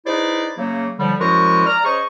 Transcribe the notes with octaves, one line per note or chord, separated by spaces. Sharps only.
D#4 E4 G#4 B4 C5 D5
C#3 F#3 A3 A#3
A2 D3 F3 G3
F#2 F3 G#3 E4 A#4 C#6
D5 A#5 F6
C#4 G#4 C5 D#5 C#6